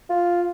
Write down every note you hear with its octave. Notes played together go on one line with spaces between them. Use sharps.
F4